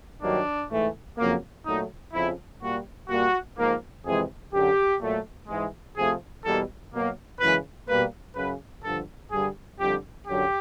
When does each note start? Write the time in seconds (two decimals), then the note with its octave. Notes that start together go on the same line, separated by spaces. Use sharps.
0.22 G2 D#3 F#3 A#3 D4
0.70 G#2 E3 A3
1.18 F2 C#3 F#3 A#3
1.66 A#2 F#3 A3 D#4
2.13 F2 C#3 F3 E4
2.61 A#2 G3 A#3 F#4
3.09 A#2 G3 A#3 F#4
3.57 G#2 F3 A#3
4.05 F2 C3 E3 G#3 G#4
4.53 F#2 D3 F#3 G4
5.01 A#2 F#3 A3
5.48 G#2 E3 G#3
5.96 C3 F3 A3 G#4
6.44 E2 B2 G3 A#3 A4
6.92 B2 F#3 A#3
7.40 F#2 C#3 E3 G#3 B4
7.88 B2 G3 A#3 B4
8.35 F#2 C#3 F#3 B4
8.83 G2 D3 F3 A4
9.31 G2 D3 G3 G#4
9.79 F2 D3 G3 G4
10.27 F#2 D3 F#3 G4